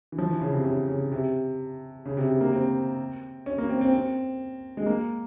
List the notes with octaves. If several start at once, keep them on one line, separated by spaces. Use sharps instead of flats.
E3
F3
E3
C#3
C3
C#3
C#3
C3
C#3
C3
C3
A#3
C4
C#4
A#3
C4
C4
C4
G#3
A#3